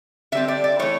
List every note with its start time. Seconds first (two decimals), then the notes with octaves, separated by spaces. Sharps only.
0.32 D3 G3 C4 E5
0.48 D5
0.64 D5
0.79 E3 A3 C#5